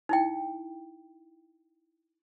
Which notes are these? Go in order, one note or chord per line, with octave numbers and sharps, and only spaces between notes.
D#4 E4 G5